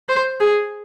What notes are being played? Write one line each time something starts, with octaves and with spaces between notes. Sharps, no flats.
C5
G#4